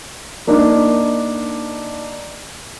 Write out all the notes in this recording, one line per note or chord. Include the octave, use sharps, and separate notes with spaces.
A#3 D4 D#4